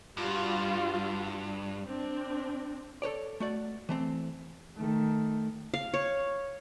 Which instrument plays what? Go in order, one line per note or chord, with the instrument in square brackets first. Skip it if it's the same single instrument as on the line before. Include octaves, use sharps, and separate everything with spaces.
[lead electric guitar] G2 [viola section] G3 F4 F#4
[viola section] C4 D4
[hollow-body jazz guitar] A4 B4 C#5 D5
A3 F#4 D5
E3 A3 C4
[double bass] D#3 A3
[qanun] F5
C#5